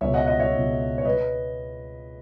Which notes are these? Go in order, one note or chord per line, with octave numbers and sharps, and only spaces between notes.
C#2 B2 C#5 E5
D#5 F#5
D#5 F#5
C#5 E5
C#2 B2
C#5
B4 D#5